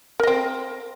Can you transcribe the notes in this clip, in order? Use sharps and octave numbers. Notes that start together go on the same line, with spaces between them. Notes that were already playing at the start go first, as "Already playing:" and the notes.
C4 A#4 D#5